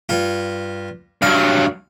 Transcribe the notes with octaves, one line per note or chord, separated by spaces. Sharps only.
G2 F4
G2 F#3 F5